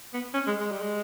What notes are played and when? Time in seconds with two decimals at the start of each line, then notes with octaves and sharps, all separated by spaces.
0.14 B3
0.34 C#4
0.47 G#3
0.60 G#3
0.72 G3
0.82 G#3